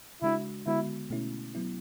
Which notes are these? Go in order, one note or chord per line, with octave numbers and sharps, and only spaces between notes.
C#3 G#3 D4 E4 F#4
D3 G#3 B3 E4 F#4
B2 A3 C#4 E4
F#3 B3 E4